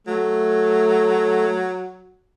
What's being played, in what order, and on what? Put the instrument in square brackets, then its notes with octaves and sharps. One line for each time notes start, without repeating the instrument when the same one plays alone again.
[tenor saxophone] F#3 [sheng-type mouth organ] A3